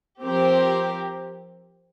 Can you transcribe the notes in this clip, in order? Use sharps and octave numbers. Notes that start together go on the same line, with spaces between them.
F3 C4 G4 A#4